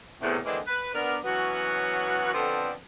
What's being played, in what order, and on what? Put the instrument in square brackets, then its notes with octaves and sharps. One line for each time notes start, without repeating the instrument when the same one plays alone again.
[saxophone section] E2 A2 C3
D3 E3 G#3 A#3 C4 D4
B4
B3 D4 A#4
E3 F#3 B3 C#4 F#4
F2 D3 B3 C4 C5 D5